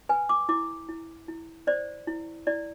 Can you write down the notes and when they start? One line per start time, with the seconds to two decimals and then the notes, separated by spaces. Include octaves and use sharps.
0.09 B4 G#5
0.29 D6
0.49 E4 D6
0.88 E4
1.28 E4
1.67 C5 D5
2.07 E4
2.47 E4 D5